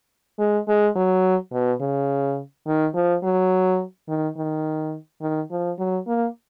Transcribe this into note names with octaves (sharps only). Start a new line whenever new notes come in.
G#3
G#3
F#3
B2
C#3
D#3
F3
F#3
D#3
D#3
D#3
F3
F#3
A#3